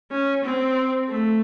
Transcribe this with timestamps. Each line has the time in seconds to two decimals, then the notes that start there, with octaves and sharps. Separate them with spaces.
0.11 C#4
0.44 C4
1.09 A3